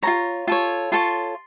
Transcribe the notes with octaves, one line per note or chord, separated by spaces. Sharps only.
F4 A4 C#5 A#5
F4 A4 C#5
F4 A4 C#5 C6